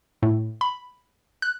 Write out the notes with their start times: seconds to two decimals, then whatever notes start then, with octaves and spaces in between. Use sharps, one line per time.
0.22 A2
0.61 B5
1.42 F#6